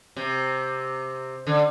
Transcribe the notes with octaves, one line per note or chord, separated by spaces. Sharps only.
C3
D3